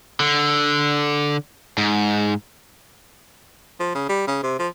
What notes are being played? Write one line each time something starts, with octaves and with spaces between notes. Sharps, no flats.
D3
G#2
F3
C#3
G3
C#3
C3
F3